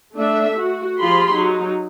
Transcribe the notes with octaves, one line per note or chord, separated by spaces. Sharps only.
A3 D4 E5
F#4
F3 F4 G4 G#4 B5 C6
F#3 D#4